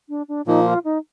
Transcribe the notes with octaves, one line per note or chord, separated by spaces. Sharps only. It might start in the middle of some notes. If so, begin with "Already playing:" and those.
D4
D4
A#2 F3 A#3 D#4
F4
D#4